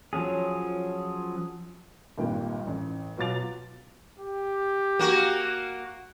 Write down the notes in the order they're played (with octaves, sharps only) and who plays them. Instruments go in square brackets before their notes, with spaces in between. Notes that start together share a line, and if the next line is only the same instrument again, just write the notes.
[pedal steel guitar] F3 F#3 C#4 G#4
[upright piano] G#1 G2 A#2 G5
A1
B2 F#3 F4 D6 A6 F7
[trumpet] G4
[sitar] A#3 F#4